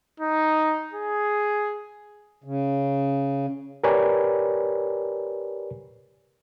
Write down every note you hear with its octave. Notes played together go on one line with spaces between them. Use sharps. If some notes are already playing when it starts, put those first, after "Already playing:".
D#4
G#4
C#3
G4 A#4 B4 C#5 D5 G#5